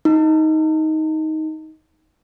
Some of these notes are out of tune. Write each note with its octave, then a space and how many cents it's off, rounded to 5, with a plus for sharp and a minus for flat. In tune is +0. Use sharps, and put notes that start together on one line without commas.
D#4 +15